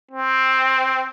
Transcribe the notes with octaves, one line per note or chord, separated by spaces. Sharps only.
C4